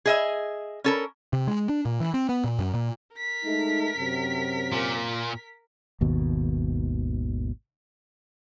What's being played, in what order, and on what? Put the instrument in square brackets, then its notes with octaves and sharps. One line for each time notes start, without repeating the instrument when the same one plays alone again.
[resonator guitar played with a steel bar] G#4 D#5 E5
C#4 A4 A#4
[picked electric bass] C3
G#3
D4
A#2
E3
C4
B3
A#2
F#2
A#2
[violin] A#4 B6
[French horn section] G#3 A3 D#4
F#2 C3
[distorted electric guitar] A#2
[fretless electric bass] G#1 D#2 B2